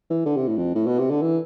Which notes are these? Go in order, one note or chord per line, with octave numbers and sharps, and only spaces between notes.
E3
D3
C3
A2
F2
A2
B2
C3
D3
E3